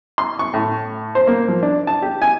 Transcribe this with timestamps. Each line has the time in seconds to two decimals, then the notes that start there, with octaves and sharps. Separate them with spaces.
0.18 C6
0.39 C#6
0.54 A2
1.15 C5
1.27 A#3
1.48 F3
1.63 D4
1.87 A5
2.02 G4
2.22 G#5